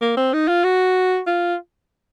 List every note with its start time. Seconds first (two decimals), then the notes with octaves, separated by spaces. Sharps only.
0.01 A#3
0.17 C4
0.33 D#4
0.48 F4
0.64 F#4
1.27 F4